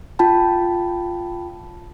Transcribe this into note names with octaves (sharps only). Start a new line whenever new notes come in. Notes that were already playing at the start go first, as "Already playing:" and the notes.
F4 G5 A5 B5